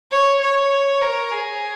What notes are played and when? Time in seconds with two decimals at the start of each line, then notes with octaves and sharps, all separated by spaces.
0.12 C#5
0.41 C#5
1.02 A#4
1.32 G#4